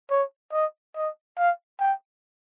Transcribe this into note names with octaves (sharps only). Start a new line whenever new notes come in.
C#5
D#5
D#5
F5
G5